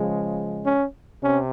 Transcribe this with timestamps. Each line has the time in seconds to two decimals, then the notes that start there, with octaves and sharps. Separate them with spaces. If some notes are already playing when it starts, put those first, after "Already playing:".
Already playing: C#3 F3 G#3
0.66 C#4
1.22 C3 C#4